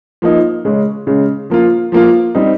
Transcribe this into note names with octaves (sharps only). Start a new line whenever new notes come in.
F3 A#3 D#4
C#3 G#3 C#4
C#3 G#3 C#4
F3 A#3 F4
F3 A#3 F4
G3 C4 D#4